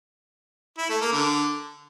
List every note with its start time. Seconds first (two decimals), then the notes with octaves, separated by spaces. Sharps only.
0.78 E4
0.89 A3
1.01 A#3
1.12 D3